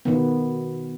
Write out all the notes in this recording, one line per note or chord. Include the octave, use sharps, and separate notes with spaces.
B2 D#3 B3